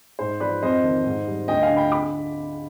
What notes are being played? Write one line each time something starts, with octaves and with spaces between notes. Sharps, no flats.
G#2 C5
F3 B4 D5
F2 C5 D#5
D#3
G#2
G3
D2 D#5 G5
F5 G#5
D3
G5 B5
B5 D6